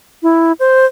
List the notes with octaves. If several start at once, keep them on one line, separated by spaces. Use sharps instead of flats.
E4
C5